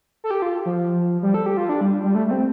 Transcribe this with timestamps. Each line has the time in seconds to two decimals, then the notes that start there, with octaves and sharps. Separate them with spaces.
0.24 A4
0.31 G4
0.42 F4
0.65 F3
1.23 G3
1.34 A4
1.46 G4
1.57 F4
1.69 D4
1.81 G3
2.04 G3
2.15 A3
2.27 A3
2.31 C4